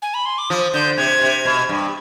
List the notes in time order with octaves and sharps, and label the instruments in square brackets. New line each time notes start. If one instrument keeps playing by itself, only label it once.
[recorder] G#5
B5
C6
D6
[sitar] F3 [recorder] D#6
[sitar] D3 [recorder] G6
[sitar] C3 [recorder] G#6
[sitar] C3
B2
G2